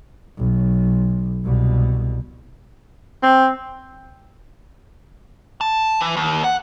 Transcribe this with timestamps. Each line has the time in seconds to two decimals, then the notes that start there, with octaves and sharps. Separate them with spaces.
0.38 B1
1.45 C2 B2
3.23 C4
5.61 A5
6.00 E3
6.17 D#2
6.44 F#5